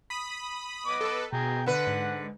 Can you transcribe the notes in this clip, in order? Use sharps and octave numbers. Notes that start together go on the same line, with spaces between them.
B5 D#6
B3 D#5 D6
A4 B4
B2 G#4 G5 A#5
D3 B4 F#5
G#2